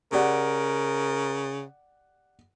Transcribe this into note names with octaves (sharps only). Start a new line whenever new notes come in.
C#3 G4 A#4 D5 F#5